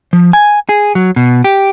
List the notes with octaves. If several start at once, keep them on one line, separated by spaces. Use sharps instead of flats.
F3
G#5
G#4
F#3
B2
G4